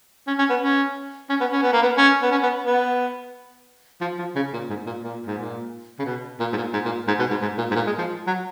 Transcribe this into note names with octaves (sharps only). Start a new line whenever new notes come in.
C#4
C#4
B3
C#4
C#4
B3
C#4
B3
A#3
B3
C#4
B3
C#4
B3
B3
F3
F3
C#3
A#2
G#2
A#2
A#2
G#2
A#2
C#3
B2
A#2
G#2
A#2
G#2
A#2
G#2
B2
G#2
G#2
A#2
G#2
A#2
G#3
F3
F#3